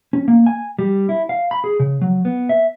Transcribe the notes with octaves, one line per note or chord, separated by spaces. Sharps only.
C#4
A#3
G#5
G3
E4
F5
B5
G#4
C#3
F#3
B3
E5